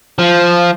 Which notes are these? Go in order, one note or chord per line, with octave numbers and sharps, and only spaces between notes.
F3